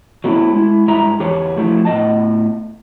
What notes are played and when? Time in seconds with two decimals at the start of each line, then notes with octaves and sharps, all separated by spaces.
0.24 F#3 A3 B3 D#4 E4
0.52 G#3 E4
0.88 G2 G#3 E4 E5 A#5
1.20 E2 G4 G#4 C#5
1.57 F3 A3 E4
1.85 A2 B3 D#5 A5